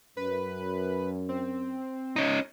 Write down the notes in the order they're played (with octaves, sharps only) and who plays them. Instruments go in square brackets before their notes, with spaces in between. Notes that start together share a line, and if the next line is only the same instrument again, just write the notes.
[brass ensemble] F#2 [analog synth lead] B4
[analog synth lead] C4
[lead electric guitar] C#4 D#4 [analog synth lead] D#5